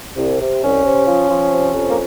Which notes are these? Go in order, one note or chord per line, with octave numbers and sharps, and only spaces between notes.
C2
C3
C2 C#4
C3
F3
F3
C3
F2
A#3